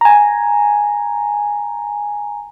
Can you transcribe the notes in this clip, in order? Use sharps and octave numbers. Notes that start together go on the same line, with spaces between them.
G#5 A#5